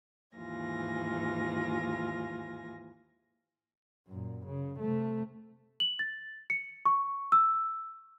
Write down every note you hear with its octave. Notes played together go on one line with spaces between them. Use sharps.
D#2 G#2 E3 F4 G#5 A#6
F#2 A#2
C#3
C3 A3
F#7
A6
C#7
C#6
E6